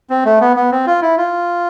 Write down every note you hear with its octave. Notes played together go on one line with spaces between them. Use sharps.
C4
A3
B3
B3
C4
F4
E4
F4